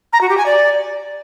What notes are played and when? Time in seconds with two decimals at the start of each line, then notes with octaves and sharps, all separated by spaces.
0.13 A#5
0.21 F#4
0.29 G4
0.38 G#5
0.46 D5